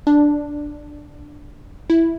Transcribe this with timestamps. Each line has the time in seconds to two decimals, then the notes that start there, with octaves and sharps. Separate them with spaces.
0.07 D4
1.90 E4